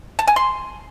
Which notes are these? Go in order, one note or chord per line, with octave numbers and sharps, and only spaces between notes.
A5
G#5
C6